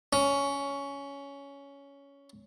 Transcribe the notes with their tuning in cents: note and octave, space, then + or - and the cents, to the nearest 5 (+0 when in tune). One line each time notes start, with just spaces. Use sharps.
C#4 +10